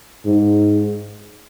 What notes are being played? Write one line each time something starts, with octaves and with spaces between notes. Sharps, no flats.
G#2